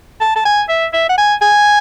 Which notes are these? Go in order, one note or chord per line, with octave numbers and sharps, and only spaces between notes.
A5
A5
G#5
E5
E5
F#5
G#5
G#5